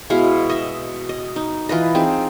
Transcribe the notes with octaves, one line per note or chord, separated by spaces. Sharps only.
B2 G#3 E4 F5
D#5 E5
D#5
D#4
E3 F4 B4 D#5
C4 D#4 G#4